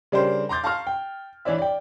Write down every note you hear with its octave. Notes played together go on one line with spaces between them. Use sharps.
C#3 G3 D4 G4 A#4 C5
A#5 C6 D6 G6 A6
F5 A5 A#5 C6 C#6 F6
G5
E3 D4 C#5 D5 E5
D5 G5